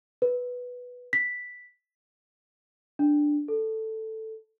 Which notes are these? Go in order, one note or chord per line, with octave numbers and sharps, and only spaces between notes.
B4
B6
D4
A4